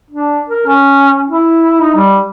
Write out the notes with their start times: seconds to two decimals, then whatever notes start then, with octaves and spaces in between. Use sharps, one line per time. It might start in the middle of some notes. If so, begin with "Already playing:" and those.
0.11 D4
0.49 A#4
0.66 C#4
1.30 E4
1.81 D#4
1.95 G3